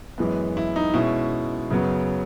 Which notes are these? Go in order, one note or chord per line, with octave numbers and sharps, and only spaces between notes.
F#2 E3 G#3 B3
E4
D#4
B2 G#3 C#4 E4
F#2 C#3 F#3 B3